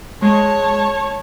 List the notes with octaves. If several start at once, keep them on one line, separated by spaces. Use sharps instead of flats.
G#3 C#5 A5